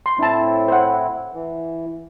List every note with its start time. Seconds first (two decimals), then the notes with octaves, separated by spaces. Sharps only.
0.06 C6
0.19 A2 C4 D4 E4 A5
0.68 C5 F#5
1.33 E3